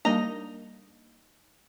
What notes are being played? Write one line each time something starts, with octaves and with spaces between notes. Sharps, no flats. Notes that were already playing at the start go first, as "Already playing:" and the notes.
G3 A#3 D4 D#4 D#5 A#5